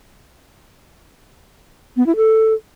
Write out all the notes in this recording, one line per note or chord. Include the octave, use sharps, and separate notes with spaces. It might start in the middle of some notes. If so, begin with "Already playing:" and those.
B3
E4
A4